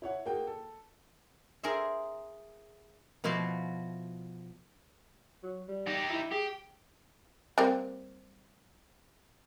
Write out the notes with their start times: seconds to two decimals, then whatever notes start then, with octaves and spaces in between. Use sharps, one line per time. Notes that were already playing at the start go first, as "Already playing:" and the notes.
0.02 E4 C#5 F#5
0.26 A#3 F#4 G#4 G5
0.47 A4
1.63 G#4 A#4 C5 E5
3.24 B2 F3 E4 F#4 F5
5.43 F#3
5.68 G3
5.87 D#4 G4
6.10 E4
6.32 G4 G#4
7.58 G3 A#3 C4